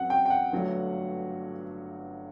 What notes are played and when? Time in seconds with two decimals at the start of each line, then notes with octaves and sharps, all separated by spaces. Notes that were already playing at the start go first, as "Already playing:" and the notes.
Already playing: F#2 F#3 C4 F#5
0.10 G5
0.26 G5
0.30 F#5
0.52 G1 G2 F#3 A3